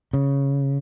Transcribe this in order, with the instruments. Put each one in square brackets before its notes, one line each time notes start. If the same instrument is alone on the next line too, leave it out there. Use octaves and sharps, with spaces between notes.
[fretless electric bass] C#3